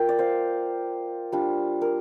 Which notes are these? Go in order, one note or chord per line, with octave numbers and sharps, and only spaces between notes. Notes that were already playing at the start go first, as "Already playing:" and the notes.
Already playing: A#3 F4 A#4 G5
D5
C5 F5
G3 D4 F4
A#4